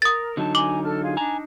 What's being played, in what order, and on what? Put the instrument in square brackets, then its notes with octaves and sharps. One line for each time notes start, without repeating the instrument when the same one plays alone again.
[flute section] A#4 [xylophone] D#6 A6
[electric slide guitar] D3 F#3 D#4 [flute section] A5
[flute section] G#5 A#5 [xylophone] D6 F#7
[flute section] A4 A5 F6
F4 G#4 F5
[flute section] D4 D#4 [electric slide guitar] G#5 A#5